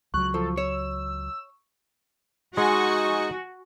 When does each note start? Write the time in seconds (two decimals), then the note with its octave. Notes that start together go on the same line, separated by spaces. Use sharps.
0.14 C#2 F#3 C#6 F#6
0.34 F3 A4
0.57 C#5 E6
2.57 G#3 D#4 F#4 F#5 G#5 C#6